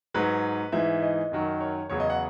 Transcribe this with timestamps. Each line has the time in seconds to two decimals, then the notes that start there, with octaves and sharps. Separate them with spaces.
0.14 G#2 F#3 B4
0.72 G#2 E3 E5
1.02 D#5
1.32 F#2 D#3 F#3
1.61 C#5
1.90 E2 C#3 F#3 C#5
2.00 D#5
2.10 F#5